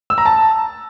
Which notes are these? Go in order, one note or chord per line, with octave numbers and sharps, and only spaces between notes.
E6
A#5
A5